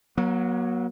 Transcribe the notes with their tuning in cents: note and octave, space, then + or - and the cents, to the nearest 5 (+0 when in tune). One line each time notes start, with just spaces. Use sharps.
F#3 +0 A#3 +45